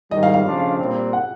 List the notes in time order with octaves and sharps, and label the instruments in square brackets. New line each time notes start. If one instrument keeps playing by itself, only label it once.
[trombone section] G#2 D#3 G3 [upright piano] D#5
[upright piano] F5
F5
[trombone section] C#3 F3 A3 D4 F4
A#2 G3 C4
[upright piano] F#5